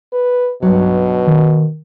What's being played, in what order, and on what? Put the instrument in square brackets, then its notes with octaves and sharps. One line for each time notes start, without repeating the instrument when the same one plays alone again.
[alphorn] B4
[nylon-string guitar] G2 F#3 [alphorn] B2
[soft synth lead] D#3